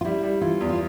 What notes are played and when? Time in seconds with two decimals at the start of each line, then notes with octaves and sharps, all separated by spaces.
0.01 F4
0.05 G3 E4
0.23 G3
0.41 E3 F4
0.61 E2
0.69 F4